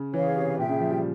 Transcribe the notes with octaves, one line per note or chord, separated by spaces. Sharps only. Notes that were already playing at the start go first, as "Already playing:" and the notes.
Already playing: C#3
E3 G#4 C#5 F5
C3
A#2 G#4 E5 G5
C#3
F3
G3